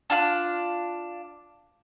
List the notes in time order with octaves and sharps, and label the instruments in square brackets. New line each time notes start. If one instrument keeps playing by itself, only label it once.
[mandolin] D4 F4 F#6